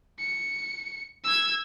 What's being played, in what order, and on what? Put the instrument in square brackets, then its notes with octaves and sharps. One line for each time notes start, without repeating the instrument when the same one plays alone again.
[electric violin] C#7
E6 G#6